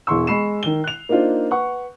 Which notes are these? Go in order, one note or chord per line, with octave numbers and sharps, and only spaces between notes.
E1 E3 C6 C#6 E6
G#3 B5 C#6 C7 E7
D#3 G7
F#6 F7
A#3 D4 D#4 F4 C5
B4 F#5 C#6